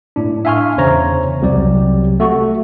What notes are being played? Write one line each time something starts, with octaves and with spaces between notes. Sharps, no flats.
A2 D4
E5 F5 G#5 C6 C#6 F6
E2 C#3 C5 C#5 A#5
C2 C3 F#3 G4 D5
A3 F#4 C#6